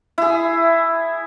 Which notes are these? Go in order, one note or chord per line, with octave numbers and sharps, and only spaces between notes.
E4 G#4